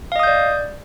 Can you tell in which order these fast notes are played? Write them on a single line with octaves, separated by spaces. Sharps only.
F5 D#5 D#6 G6 D5